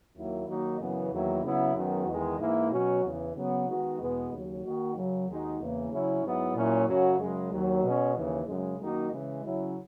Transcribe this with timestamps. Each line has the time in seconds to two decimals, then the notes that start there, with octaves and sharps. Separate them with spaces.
0.15 D#2 D#3 F#3 A#3 E4
0.47 D#3 F#3 A#3 D#4 F#4
0.79 F#2 C#3 E3 B3
1.11 E2 D#3 F#3 A#3 E4
1.43 C#3 F#3 B3 E4
1.75 F#2 D#3 G#3 B3 F#4
2.07 E2 D#3 G#3
2.39 G#2 E3 A#3 E4
2.71 B2 F#3 C#4 F#4
3.03 E2 C#3 E3
3.35 C#3 F#3 B3
3.67 D#3 G#3 B3 D#4 F#4
3.99 E2 B2 G#3 B3
4.31 D#2 C#3 F#3
4.63 D#3 A#3 D#4 F#4
4.95 F#2 C#3 F#3
5.27 D#2 D#3 G#3 D#4 F#4
5.59 E2 C#3 E3 A#3
5.91 C#3 F#3 C#4 E4
6.23 G#2 F#3 B3 E4
6.55 A#2 F#3 C#4 E4
6.87 F#2 C#3 F#3 C#4 F#4
7.19 F#2 C#3 G#3
7.51 D#2 D#3 F#3
7.83 B2 G#3 C#4
8.15 D#2 C#3 E3
8.47 F#2 C#3 G#3
8.79 F#2 D#3 A#3 D#4 F#4
9.11 C#3 E3 G#3
9.43 C#3 F#3 C#4 E4